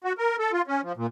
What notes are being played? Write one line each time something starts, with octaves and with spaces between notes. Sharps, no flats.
F#4
A#4
A4
F4
C#4
F3
A#2